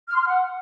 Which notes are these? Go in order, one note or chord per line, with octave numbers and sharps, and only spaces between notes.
F6
C6
F6
F#5